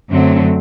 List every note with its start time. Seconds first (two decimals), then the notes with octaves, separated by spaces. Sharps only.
0.10 F#2 D3 F#3 A3 C4